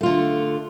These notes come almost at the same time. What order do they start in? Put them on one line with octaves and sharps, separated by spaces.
A3 F4 D3